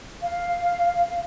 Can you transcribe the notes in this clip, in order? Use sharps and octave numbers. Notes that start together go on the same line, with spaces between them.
F5